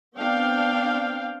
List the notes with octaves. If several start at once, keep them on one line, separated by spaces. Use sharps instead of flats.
B3 C4 D4 F5 G5